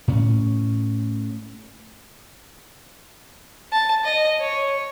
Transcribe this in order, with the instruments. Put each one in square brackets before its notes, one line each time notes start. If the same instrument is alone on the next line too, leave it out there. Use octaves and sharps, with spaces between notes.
[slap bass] A2 C#4
[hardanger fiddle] A5
D#5
C#5